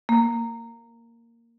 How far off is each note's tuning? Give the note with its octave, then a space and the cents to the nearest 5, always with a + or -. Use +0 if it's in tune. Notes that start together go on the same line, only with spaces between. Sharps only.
A#3 -10